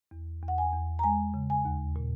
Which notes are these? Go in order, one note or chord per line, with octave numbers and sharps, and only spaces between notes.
E2
E2
F#5
G#5
E2
A#5
G#3 G#5
C#3
G#5
D#2
A#2